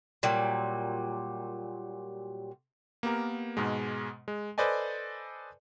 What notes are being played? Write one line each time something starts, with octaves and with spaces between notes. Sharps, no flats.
A#2 F#3 G3
A#3 B3 G4 A#4
G#2 B2 G#3
G#3
A4 B4 C5 D5 D#5 G#5